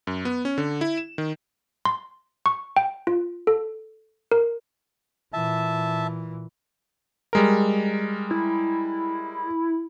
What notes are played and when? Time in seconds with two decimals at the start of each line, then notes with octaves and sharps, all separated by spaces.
0.07 F#2
0.25 B3
0.45 C#4
0.58 D3
0.81 E4
0.98 E7
1.18 D#3
1.85 C6
2.46 C#6
2.77 G5
3.07 F4
3.47 A4
4.32 A#4
5.33 A#2 E3 E5 A5
7.33 G3 G#3 A#4
8.31 E4